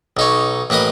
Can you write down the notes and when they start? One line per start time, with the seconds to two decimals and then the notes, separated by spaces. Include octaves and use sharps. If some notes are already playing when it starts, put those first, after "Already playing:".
0.17 B1 D#4 C#5
0.70 A1 A#3 B4 D#5 D#6